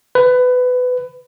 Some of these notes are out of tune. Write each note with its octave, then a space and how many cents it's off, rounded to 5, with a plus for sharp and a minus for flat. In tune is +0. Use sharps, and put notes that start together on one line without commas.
B4 +20